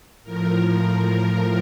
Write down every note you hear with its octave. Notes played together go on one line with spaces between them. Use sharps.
A2 F3 A#4